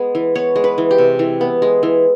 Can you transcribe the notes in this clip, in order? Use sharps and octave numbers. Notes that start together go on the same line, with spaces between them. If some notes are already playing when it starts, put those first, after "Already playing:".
Already playing: G#3 B3
E3
B3 C#5
G#3
B4
E3
G4
C3
E3
B3
G#3
E3